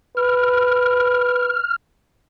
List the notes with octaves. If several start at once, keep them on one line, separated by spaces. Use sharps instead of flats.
B4 F6